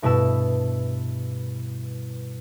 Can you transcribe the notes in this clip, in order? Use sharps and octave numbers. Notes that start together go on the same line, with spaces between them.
G2 B2 E4 B4 A5 E6